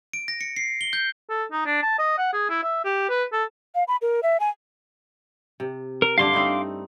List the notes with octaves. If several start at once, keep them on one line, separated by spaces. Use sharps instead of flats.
D7
A#6
C#7
C7
G7
G6
A4
D#4
D4
A5
D#5
F#5
G#4
E4
E5
G4
B4
A4
F5
B5
A#4
E5
G#5
C3
A#4
G2 D3 A3 F5 C6 D6
C4 D#4 E4